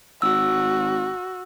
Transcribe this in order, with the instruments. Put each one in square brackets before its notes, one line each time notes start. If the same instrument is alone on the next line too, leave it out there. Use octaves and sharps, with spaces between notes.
[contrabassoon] G#1 [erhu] F#4 [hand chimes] E6